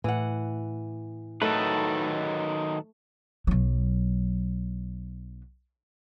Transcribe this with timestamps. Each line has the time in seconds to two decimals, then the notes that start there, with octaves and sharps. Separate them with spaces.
0.04 A2 E3 F#5
1.42 D#3 F#3 A3 D#4 A4 B4
3.47 B1 F#3